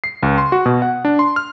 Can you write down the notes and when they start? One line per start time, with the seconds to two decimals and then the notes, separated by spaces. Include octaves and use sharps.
0.04 C7
0.23 C#2
0.38 C6
0.52 F#4
0.66 B2
0.82 F#5
1.05 D4
1.19 C6
1.36 F6